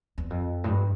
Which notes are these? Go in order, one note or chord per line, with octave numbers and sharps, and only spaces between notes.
E2
F2
A2
G2